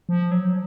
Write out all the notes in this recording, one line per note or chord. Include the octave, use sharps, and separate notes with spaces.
F3
F#3